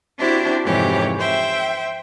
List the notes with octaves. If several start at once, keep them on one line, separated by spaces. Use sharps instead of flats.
C4 D4 E4 F#4 G4 C5
F2 G#2 C3 E3 G4 C#5
C5 E5 G5